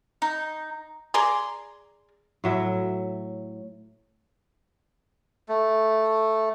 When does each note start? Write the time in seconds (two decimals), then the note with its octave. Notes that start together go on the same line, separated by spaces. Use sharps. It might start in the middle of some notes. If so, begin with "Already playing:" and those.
0.22 D#4
1.14 G#4 D5 A#5 C6
2.44 A2 F#3 E5
5.49 A3